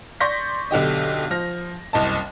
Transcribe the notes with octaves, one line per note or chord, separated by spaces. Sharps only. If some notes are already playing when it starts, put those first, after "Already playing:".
D5 C6 C#6 G6 A#6 B6
B1 D3 G4 D#5
F3 F6 A#6
F#1 C2 D#5 A5